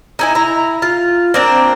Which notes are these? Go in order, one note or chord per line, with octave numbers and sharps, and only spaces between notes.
D#4 E4 G#5
E4 A#5
F4
A#3 C4 D4